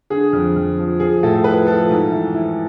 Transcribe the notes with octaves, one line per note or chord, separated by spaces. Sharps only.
D3 G#4
F2
F2
F3
F3 G#4
A2 A4
F3 B4
F3 A4
G#2
E3
E3